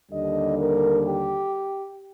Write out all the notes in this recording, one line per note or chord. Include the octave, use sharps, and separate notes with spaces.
D#2 D3 G3 D4 D#5
A#4
G4